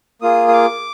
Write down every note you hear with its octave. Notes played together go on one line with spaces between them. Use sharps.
A#3 F4 G#4 D#6
D#6
D6